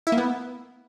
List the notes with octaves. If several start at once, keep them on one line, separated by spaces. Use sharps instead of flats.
E4
A#3
B3